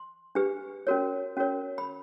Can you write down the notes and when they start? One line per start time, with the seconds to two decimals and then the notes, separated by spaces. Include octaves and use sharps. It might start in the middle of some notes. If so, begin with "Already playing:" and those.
Already playing: C6
0.35 D4 G4 B4
0.87 C#4 F#4 A#4 C#5
1.37 C#4 F#4 A#4 C#5
1.78 B5